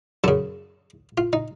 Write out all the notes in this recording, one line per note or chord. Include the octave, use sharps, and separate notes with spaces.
F#2 C#3 A4
F4
D#4